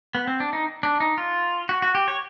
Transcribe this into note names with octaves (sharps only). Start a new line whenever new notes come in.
B3
C4
D4
D#4
D4
D#4
F4
F#4
F#4
G4
C#5